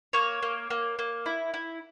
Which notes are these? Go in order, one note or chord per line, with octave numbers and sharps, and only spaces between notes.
A#3 C#5
A#3
A#3
A#3
E4
E4